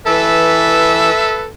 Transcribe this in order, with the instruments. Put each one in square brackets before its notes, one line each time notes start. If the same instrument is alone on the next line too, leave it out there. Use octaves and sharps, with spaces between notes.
[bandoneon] E3 [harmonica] A4 B4 [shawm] E5